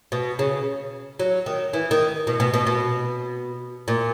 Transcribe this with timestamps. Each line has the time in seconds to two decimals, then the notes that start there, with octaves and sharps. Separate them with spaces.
0.12 B2
0.39 C#3
1.19 F#3
1.46 D#3
1.73 E3
1.91 D#3
2.27 B2
2.40 B2
2.54 B2
2.67 B2
3.88 A#2